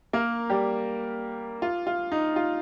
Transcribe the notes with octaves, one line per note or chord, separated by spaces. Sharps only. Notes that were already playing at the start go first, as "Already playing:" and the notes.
A#3 A#4
G3 G4
F4
F4
D#4
F4